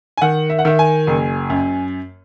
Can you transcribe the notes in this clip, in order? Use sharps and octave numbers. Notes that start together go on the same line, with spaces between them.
G#5
D#3 F#5
E5
F#5
D#3 E5
G#5
F#1
F#2